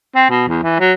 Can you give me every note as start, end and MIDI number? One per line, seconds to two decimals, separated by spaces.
0.15 0.26 60
0.29 0.46 47
0.48 0.59 40
0.63 0.79 52
0.80 0.93 54